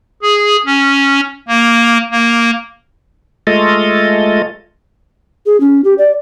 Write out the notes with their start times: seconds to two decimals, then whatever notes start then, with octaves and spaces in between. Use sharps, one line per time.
0.22 G#4
0.66 C#4
1.48 A#3
2.12 A#3
3.47 G#3 A3 F4 A4 D#5
5.46 G#4
5.60 C#4
5.84 G4
5.98 D5